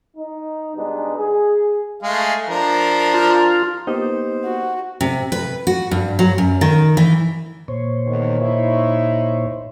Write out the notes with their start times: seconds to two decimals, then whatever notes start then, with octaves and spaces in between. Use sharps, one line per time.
0.17 D#4
0.76 B2 G3 G#3 B3 D4 D#4
1.16 G#4
2.03 G#3 A3 F5
2.49 F3 D4 A#4
3.14 F4
3.87 A#3 B3 D#4 G4 C5
4.45 F#4
5.01 C3
5.32 B4
5.67 F#4
5.91 G2
6.19 F#3
6.38 F#2
6.61 D#3
6.97 E3
7.68 A#2 C5 C#5
8.06 E2 B2 D#3
8.41 D#4 E4